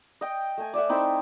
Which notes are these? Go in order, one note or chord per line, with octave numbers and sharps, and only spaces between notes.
D#5 G5
A3 G#5
D5 E5 F#5
C4 D#4 E4 G5